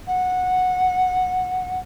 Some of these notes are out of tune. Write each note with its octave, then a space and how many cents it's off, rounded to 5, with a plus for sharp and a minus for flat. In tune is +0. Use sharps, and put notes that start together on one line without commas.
F#5 -10